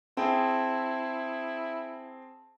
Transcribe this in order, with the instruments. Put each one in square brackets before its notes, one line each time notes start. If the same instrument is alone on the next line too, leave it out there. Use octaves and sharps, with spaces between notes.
[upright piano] C4 G#4 G5 [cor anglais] E4 [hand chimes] A5